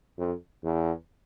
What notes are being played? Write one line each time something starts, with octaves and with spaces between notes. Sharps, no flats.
F2
E2